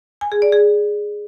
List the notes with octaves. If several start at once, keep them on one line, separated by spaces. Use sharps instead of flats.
G#5
G#4
D5
G#4